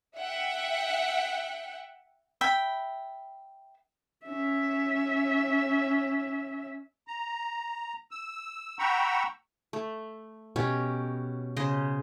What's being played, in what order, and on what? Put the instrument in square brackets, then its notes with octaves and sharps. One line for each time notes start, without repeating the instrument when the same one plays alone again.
[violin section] E5 F#5 G5
[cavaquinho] E5 G5 B5
[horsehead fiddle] C#4 E5
[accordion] A#5
E6
F#5 G5 A#5 B5 C#6 E6
[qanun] A3
[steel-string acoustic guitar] B2 [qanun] C#4 G4 C#5
[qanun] C#3 C5 D#5